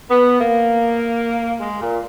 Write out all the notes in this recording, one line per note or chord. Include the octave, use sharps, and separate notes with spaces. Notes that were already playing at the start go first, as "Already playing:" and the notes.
B3
A#3
G#3
A#2